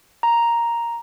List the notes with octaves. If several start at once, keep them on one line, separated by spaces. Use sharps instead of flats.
A#5